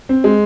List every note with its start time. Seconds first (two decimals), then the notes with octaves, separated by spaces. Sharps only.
0.09 C4
0.24 G#3